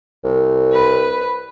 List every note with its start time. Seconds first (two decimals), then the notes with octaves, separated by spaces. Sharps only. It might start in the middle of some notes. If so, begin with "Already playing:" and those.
0.24 C2
0.73 B4